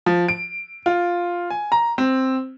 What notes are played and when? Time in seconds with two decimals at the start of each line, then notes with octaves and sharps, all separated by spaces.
0.06 F3
0.28 D7
0.86 F4
1.50 G#5
1.72 A#5
1.98 C4